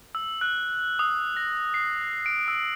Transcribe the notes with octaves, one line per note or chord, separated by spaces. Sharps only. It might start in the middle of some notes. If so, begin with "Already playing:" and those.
E6
F#6
D#6
A#6
C7
D7
E6